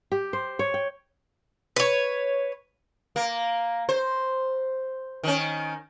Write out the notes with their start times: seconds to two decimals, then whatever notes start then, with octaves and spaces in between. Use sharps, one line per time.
0.12 G4
0.33 C5
0.59 C#5
0.74 G5
1.76 B4 C#5
3.16 A#3
3.89 C5
5.24 D#3 C#4